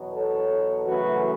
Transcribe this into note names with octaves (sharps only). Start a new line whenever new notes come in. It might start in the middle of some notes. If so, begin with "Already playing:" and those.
Already playing: E2 B2 F#3
A4 C#5
F#2 C#3 E3 A3 F#4 B4